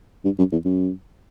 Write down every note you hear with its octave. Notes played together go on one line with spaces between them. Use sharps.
G2
F#2
E2
F#2